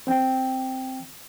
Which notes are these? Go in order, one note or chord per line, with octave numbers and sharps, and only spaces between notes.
C4 G5